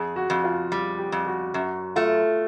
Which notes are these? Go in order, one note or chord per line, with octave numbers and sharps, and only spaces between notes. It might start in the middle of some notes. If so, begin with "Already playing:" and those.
Already playing: F2 G#4
F#4
F2
F4
G3
G4
F2
F#4
F#2 F#4
A3 F4